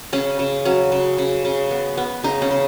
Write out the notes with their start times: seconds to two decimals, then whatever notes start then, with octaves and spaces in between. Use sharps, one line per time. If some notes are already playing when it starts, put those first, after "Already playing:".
0.13 C#3 C#4
0.39 C#3
0.65 F#3 C#4
0.92 C#3
1.18 C#3
1.45 C#3
1.71 B3
1.97 B3
2.24 C#3 D#4
2.42 C#4
2.51 C#3